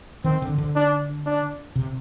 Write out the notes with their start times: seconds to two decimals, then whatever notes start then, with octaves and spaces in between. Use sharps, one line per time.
0.24 D#3 C4
0.42 D3
0.58 D3
0.76 D4
1.25 D4
1.76 C3